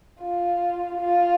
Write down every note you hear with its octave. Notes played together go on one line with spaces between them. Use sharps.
F4
F4